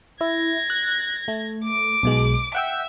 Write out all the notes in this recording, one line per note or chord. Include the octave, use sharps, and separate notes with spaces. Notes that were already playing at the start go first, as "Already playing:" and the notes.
E4 G#6 A#6
F#6
A3
D6 D7
B1 B2 G#3
E5 F#5 G5 E6